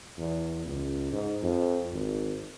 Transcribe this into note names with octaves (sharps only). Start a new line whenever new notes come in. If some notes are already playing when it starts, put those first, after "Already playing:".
E2
C#2
G#2
F2
G#1